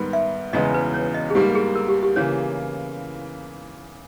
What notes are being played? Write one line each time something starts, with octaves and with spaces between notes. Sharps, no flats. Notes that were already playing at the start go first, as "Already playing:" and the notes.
Already playing: G#2 D#3 G3 B3
E5
E1 E2 C#3 G#3 B3 D#5
B4
C#5
D#5
G#4
G#2 G3 A#3 G4
G#4
A#4
G4
G4
C#3 E3 A#3 C#5